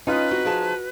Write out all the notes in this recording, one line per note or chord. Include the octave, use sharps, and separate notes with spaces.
C#4 D#4 F4 B4
C4 F#4
F3 G#4 A5